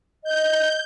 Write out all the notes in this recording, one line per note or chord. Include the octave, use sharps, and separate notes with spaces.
D#5 G6